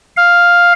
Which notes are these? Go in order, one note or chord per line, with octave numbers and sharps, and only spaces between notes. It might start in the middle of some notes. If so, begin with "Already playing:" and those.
F5